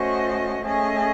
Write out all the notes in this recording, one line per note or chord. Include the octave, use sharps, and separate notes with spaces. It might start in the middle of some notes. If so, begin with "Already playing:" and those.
Already playing: A3 C#4 F#4 C5 D#5
A3 C#4 G#4 D#5